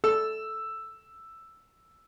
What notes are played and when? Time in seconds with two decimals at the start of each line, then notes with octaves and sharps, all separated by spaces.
0.04 A4 E6